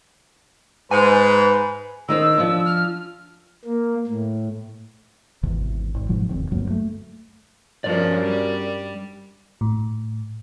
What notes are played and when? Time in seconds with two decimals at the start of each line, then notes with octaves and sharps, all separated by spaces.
0.91 G#2 B4 G#5
2.09 D#3 D#4 C5 E6
2.38 F3 D4
2.65 F6
3.65 A#3
4.07 A2
5.43 G#1 E2 C3 E3
5.94 G#1
6.09 G#2 B2 F3 F#3
6.29 F1 D#2 C4
6.51 D2 G2 F#3 A#3
6.70 A3
7.84 G2 F3 C#4 F#4 A#4 D5
8.20 G3
9.61 A2